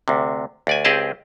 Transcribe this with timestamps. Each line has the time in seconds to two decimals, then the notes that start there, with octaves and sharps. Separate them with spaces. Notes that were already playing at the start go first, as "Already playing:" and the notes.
0.08 D2 C3
0.67 D2 D5 G#5
0.85 C#2 C4 G4 G#4 D#5 A5